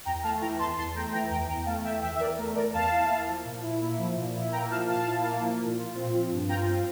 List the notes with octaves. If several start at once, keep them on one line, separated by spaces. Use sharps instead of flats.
E2 G5 A#5
A3 F5 A5
E3 G5 A#5
E2 A5 C6
E2 A5 C6
A3 G5 A#5
E3 G5 A#5
E2 G5 A#5
E2 G5 A#5
A3 F5 A5
E3 E5 G5
E2 E5 G5
E5
E2 A#4 D5
A3 A#4
E3 A#4 D5
E2 F5 A5
E4
A#3
F3
A#2
E4
A#3
F3
A#2
E4
A#3 G5 A#5
F3 F5 A5
A#2 F5 A5
E4
A#3
F3
A#2
F4
C4
F3
G2
F4 G5 A#5
C4